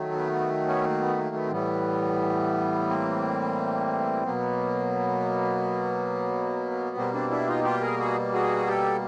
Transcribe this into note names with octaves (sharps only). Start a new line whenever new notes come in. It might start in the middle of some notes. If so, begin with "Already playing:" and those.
Already playing: D#3 F#3 A3
B3
B3
B3 C#4
A#3
B3
A#3
B3
C4
A2 E3 G3 B3
A#3 C4
B2 F#3 A#3 B3
B2 G3 A#3 C4
C4 D4
D4 E4
D#4 F4
F4 G4
G#4 A#4
F#4 G#4
F#4 G#4
G4 A4